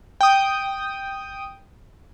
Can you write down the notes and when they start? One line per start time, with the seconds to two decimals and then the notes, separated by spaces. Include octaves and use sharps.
0.21 G5 D#6